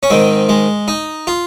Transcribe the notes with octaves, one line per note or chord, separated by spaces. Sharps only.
C#4
G#2 D#3 C4
G#3
D#4
F4